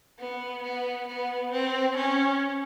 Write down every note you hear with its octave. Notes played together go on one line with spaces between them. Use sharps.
B3
B3
B3
C4
C#4